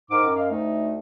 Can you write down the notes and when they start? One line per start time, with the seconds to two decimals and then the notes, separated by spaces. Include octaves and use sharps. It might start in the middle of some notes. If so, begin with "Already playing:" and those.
0.10 G#2 D#3 A#4 D6
0.24 F#2
0.36 D#5 F5
0.51 D2 A3 D#4